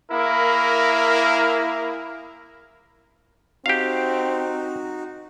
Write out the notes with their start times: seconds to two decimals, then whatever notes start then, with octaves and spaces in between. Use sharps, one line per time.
0.12 A#3 E4 G#4 A#4
3.66 C4 D#4 F#4 G4 F5